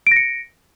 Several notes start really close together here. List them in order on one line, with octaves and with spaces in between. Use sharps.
D7 A#6 C#7